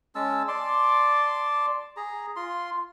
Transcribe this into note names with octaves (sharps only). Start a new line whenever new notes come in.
G#3 C#4 A5 E6
D5 A5 C6 D6
G#4 A#5
F4 C6